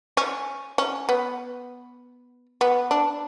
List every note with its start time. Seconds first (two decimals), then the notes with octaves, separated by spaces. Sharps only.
0.17 C#4
0.78 C#4
1.09 B3
2.61 B3
2.91 D4